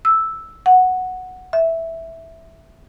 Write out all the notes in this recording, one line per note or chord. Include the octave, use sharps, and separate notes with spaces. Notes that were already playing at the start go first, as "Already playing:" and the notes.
E6
F#5
E5